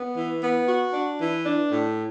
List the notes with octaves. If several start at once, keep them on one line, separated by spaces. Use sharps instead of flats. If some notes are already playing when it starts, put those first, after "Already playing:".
Already playing: B3
E3
B3
F#4
D4
E3
D4
A2